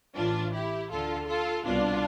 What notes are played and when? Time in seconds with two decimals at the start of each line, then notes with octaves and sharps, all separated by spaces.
0.16 A1 A2 E3 D4 F4
0.53 E4 G4
0.91 D2 D3 F4 A4
1.28 F4 A4
1.66 C2 B2 D4 F4